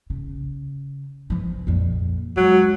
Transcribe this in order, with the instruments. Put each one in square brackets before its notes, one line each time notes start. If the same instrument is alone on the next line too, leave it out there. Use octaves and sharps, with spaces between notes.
[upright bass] C#3
E3 F3
A#1 F2
[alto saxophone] F#3 [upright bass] G#3